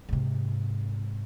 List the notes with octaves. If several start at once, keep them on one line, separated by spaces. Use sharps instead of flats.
G#2 C3